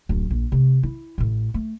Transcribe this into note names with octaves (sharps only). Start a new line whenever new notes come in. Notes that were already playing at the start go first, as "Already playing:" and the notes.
D1 F#2
A#1
C3 A3
E4
A1 A2
A3